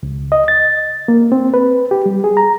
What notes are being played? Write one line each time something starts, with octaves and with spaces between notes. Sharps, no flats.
C#2
D#5
A6
A#3
C4
B4
G4
G3
G#4
A#5